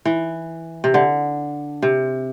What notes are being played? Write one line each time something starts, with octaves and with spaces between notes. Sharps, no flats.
E3
C3
D3
C3